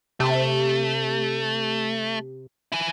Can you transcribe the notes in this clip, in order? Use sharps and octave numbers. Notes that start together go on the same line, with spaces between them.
C3 A3
E4 G#5